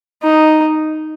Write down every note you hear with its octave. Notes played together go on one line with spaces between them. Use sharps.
D#4